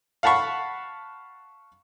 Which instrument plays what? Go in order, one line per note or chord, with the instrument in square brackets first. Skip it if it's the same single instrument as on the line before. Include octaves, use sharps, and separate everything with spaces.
[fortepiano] F5 F#5 A5 B5 C#6